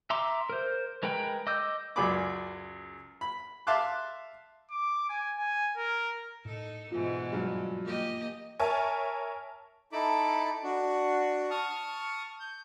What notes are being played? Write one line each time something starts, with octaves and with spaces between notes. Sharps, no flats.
E5 A#5 C6 D6
A#4 C5
G#3 A#4 B4 G5
D#5 D6 E6 G6
C#2 F#2 G#4 D5 B5 D6
B5
E5 F5 A5 C6 D6 F#6
D6
G#5
G#5
A#4
A2 D#4 A4
G#2 B2 E3 F4 G#5
G2 F#3 G#3
A#3 G4 D#5
A#4 C#5 E5 G#5 A5
D#4 E4 A4 A5 B5 D6
D4 F#4
A5 C#6 D#6 F6
G6